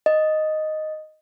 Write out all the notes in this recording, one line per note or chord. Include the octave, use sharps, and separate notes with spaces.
D#5